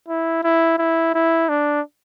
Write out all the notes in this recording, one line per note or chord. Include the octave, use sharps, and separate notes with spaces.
E4
E4
E4
E4
D4